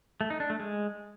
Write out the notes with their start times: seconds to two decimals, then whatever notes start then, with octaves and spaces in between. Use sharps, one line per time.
0.21 A3
0.30 D#4
0.40 D4
0.50 A3
0.60 G#3